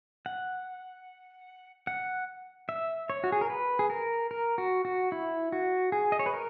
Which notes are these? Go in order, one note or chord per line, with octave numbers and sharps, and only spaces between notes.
F#5
F#5
E5
C#5
F#4
G#4
A#4
B4
G#4
A#4
A#4
F#4
F#4
E4
F#4
G#4
D#5
C#5
B4
A#4